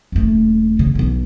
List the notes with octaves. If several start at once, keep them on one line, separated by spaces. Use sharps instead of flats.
D#1 A3
C#3
B1 B2